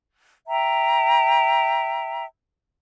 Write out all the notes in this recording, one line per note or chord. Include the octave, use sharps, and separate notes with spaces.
E5 G5 A#5